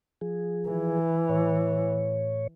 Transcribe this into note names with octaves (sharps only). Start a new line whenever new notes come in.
F3 G#4
E3
A2 C#5